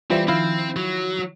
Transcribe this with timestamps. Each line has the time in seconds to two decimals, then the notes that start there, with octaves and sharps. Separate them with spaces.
0.10 E3 G3 C4 F4 C5 E5
0.28 D#3 F3 C4 E4 F5
0.76 F#3